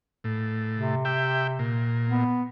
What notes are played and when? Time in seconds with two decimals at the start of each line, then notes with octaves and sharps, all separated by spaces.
0.24 A2
0.76 C3
1.05 G4 E5 G5
1.59 A#2
2.09 B3